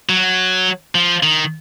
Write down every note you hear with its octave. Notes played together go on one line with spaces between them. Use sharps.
F#3
F3
D#3